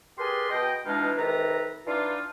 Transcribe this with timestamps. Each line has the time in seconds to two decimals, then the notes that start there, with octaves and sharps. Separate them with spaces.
0.18 G4 G#4 A#4 B4 D5 C6
0.50 B2 D#5 G5
0.86 B2 E3 G#3 D4 D#4 F4
1.17 C3 D#3 A4 B4 A#5
1.86 E3 D4 D#4 F4